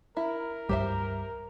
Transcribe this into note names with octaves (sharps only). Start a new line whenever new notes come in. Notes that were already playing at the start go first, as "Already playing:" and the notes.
E4 A#4
C#2 G2 G3 G4 C5 E5